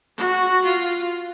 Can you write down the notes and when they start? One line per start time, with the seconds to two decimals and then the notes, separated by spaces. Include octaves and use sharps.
0.17 F#4
0.65 F4